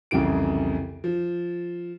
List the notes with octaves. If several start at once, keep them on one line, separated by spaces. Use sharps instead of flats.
C2 F2 C#3 E3 D7
F3